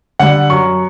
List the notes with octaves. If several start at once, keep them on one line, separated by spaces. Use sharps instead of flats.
D3 G3 F#5
F#2 C#6